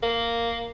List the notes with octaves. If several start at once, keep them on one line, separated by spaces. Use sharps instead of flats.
A#3